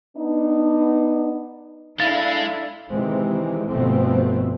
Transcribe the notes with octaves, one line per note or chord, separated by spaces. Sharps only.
B3 D4 D#4
G#3 D4 E4 A4 F5 A6
C3 D#3 E3 G#3 C4
G1 B2 F3 A3 B3 C4